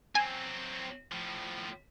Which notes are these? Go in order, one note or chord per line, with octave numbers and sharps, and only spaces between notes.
F#3 C4 G#5
A2 F3